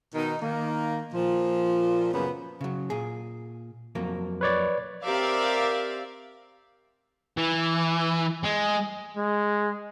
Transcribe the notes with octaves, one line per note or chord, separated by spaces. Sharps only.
B2 D#3 D#4
D#3 A#3
A#2 F3
F#2 C#3 A#3 B3
C#3 F#3
A#2 G#4
F2 F#3 A#3
B4 C#5 D5
C4 G4 A#4 D5 E5 F5
E3
G#3
G#3